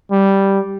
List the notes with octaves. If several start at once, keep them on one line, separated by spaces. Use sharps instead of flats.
G3